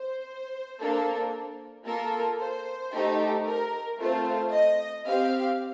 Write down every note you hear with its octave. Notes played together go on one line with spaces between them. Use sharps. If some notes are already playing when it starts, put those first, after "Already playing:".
Already playing: C5
A#3 D4 A4
A#3 F4 A4 A#4
C5
A3 D#4 G4
A#4
A3 C4 F4 C5
D#5
C4 G4 F5